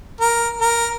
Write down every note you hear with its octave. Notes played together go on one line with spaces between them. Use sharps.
A#4
A#4